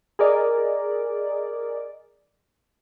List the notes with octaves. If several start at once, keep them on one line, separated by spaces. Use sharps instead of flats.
G#4 A#4 D5 D#5